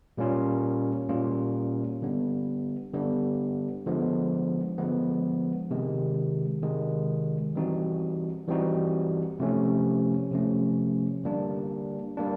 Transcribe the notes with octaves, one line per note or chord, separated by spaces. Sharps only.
A#2 G3 A#3 C#4 F4
A#2 G3 A#3 C#4 F4
D3 G3 B3
D3 G3 B3
D3 F3 G#3 B3
D3 F3 G#3 B3
C3 D#3 G#3
C3 D#3 G#3
E3 G3 C4 D#4 F#4
E3 G3 C4 D#4 F#4
C3 F3 A3 C#4
C3 F3 A3 C#4
D3 G3 A#3 D4
G3 A#3 D4